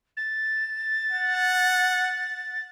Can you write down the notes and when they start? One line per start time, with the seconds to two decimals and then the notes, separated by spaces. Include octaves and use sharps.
0.17 A6
1.12 F#5